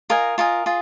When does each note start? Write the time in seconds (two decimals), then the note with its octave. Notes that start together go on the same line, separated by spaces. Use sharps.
0.10 F4 A#4 D#5 G#5
0.38 F4 A#4 D#5 G#5
0.66 F4 G#4